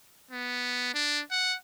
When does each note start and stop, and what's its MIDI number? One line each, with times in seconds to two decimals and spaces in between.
0.31 0.93 59
0.94 1.21 62
1.31 1.55 78